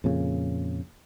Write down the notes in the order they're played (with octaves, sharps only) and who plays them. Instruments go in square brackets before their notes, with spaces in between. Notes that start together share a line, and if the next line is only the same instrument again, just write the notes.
[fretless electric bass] F2 A#2 C#3